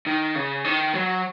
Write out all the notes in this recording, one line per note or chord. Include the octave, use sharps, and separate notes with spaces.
D#3
C#3
D#3
F#3